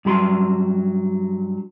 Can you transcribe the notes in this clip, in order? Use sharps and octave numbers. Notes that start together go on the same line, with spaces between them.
G2 F#3 B5 C6